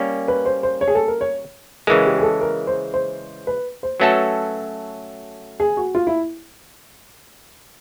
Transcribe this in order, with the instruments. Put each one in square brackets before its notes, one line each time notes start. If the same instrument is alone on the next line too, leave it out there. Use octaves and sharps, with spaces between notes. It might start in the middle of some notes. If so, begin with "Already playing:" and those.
Already playing: [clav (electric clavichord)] G3 A#3 C#4 [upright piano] A#4
[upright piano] B4
C5
C5
C#5
G#4
A4
A#4
C#5
[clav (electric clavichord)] C#3 E3 G#3 [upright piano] A#4
[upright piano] G4
G#4
A4
A#4
C5
C5
B4
C5
[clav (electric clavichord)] F#3 A3 C#4 F#4 A4 [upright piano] B4
[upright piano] G#4
F#4
F4
E4